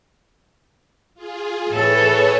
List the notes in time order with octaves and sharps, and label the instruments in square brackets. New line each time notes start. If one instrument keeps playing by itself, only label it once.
[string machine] F4 G#4
[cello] A2 A4 [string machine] G#4 B4 C#5